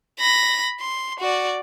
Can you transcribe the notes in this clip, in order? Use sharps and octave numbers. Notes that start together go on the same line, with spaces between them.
B5 A#6
C6
F#4 D5